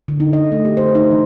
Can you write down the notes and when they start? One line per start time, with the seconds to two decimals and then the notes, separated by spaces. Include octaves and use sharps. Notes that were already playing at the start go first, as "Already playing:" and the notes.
0.08 D3
0.20 D#4
0.33 D#5
0.52 A3
0.65 G4
0.77 C5
0.95 D#4
1.11 E3